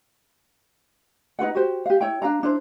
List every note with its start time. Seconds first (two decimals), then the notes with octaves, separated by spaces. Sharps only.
1.39 D#4 F4 B4 F#5
1.55 F#4 G4 C5
1.86 G4 F5
2.01 E4 C#5 G5
2.22 D4 G#4 F5 A#5
2.43 D4 E4 C5